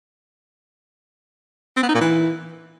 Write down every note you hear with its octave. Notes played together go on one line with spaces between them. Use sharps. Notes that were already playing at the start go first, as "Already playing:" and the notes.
C4
B3
D#4
A#2
E3